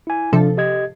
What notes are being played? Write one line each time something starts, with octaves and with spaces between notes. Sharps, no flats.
E4 G#5
C3 F3 D4 A4
G4 D#5 G#6